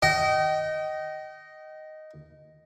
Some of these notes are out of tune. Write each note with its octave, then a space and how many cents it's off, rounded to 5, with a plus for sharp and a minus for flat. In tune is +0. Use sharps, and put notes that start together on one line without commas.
D#5 +0 G5 -35